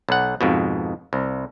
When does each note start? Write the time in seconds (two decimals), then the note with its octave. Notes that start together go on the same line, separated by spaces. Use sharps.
0.09 B1 F#5
0.41 F2 G#2 B2
1.13 C2